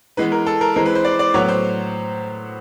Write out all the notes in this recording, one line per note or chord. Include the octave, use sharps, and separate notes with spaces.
E3 G#3 B3 B4
A#4
A4
A#4
E3 G#3 C4 A#4
B4
C5
D5
D5
A2 F#3 B3 C#5
C5